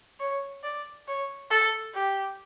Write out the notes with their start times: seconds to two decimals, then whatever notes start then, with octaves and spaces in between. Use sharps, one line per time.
0.20 C#5
0.64 D5
1.07 C#5
1.51 A4
1.95 G4